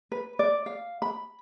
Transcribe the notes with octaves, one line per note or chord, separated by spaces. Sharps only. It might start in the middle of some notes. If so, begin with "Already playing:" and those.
B4
D5
F5
B5